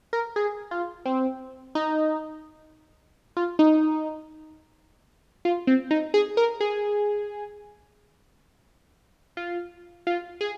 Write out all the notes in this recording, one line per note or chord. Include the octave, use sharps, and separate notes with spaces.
A#4
G#4
F4
C4
D#4
F4
D#4
F4
C4
D#4
G#4
A#4
G#4
F4
F4
G#4